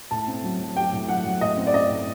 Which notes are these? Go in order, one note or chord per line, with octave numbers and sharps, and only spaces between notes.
A2 A5
C4
F#3
F#3
G4 G5
A2
F#3 F#5
F#3
A2 D#5
C4
D5
C4 D#5
A2